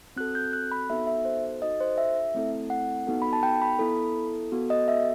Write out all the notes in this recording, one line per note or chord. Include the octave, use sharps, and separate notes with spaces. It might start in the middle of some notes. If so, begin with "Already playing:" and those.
C4 F#4 A4 F#6
G6
F#6
B5
B3 D#4 F#4 A4 E5
E5
C5
D#4 F#4 A4 D#5
C5
E5
A3 C4 E4 A4
F#5
B3 D#4 F#4 A4
B5
A5
G5
B5
B3 E4 A4
B3 F#4 A4
D#5
E5